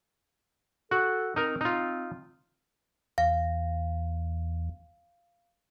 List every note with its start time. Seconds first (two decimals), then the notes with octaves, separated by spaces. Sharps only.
0.91 F#4 A4
1.36 C4 D#4 A#4
1.61 D#4 F4
3.18 E2 F5